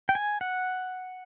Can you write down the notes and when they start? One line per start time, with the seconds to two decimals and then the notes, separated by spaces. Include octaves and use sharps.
0.09 G5
0.15 G#5
0.41 F#5